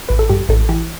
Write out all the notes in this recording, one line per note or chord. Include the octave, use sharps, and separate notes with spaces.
A1 B4
A4
G2 G4
A1 A4
E3 G4